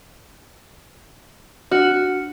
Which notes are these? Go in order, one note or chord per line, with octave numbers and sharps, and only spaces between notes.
D4 F#4 F6 C#7